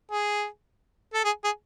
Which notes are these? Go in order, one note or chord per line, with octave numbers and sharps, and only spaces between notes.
G#4
A4
G#4
G#4